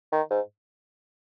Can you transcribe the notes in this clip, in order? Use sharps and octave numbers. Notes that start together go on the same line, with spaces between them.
D#3
G#2